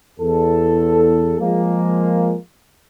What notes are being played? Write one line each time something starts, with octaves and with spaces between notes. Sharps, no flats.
E2 A4
F3 G#3 A#3